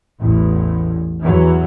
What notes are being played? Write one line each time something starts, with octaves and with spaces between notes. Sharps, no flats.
A1 E2
E2 E3 F#3